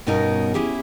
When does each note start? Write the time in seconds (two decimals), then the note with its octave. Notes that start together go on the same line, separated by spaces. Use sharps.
0.06 G2 B2 C#4 D#4 A#4 A#5
0.54 C#4 E4 G4 G#4